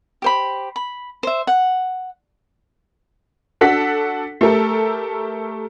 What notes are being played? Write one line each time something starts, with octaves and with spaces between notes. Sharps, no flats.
G4 C5 B5
B5
C5 E5
F#5
D4 F#4 A4 F#5 B6
A3 G4 A4 A#4